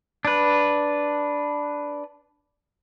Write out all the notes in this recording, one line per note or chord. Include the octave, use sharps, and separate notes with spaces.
D4 B4